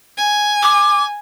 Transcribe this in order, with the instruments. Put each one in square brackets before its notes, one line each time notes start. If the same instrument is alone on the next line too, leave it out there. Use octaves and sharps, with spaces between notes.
[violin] G#5
[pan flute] D6